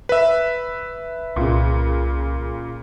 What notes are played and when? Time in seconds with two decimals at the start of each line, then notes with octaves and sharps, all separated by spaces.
0.09 B4 E5
1.36 C2 A#2 C#3